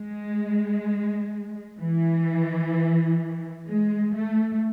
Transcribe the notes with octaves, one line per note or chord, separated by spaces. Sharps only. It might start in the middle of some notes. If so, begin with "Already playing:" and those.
Already playing: G#3
E3
G#3
A3